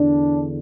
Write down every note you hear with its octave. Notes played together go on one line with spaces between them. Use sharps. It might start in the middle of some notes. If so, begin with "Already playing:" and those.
Already playing: E2 D3 D4